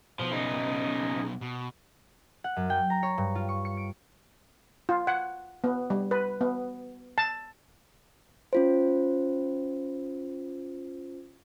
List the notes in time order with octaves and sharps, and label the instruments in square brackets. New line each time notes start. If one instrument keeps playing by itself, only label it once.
[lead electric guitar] B1 B3 [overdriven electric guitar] F3
[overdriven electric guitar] C#3 D#4
[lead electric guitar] B2
[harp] F#5
F#2
G5
A#5
C#5
G2
F4
C#6
C#7
D7
[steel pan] F4
F#5
B3
G3
B4
B3
A5
[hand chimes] C#4 F4 C5